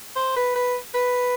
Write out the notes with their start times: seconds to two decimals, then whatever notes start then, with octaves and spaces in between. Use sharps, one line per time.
0.16 C5
0.36 B4
0.55 B4
0.94 B4